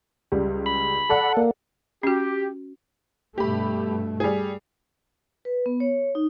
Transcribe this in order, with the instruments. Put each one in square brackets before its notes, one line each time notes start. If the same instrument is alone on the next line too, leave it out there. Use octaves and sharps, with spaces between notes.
[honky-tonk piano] C#2 G3
[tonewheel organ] B5
[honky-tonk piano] A4 D5 F#5
[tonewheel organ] A#3
[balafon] C#4 F#4 [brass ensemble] G4
[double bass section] G2 B2 A3 [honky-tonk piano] G4 B5
[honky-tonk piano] G3 G#4
[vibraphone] B4
B3
C#5
D#4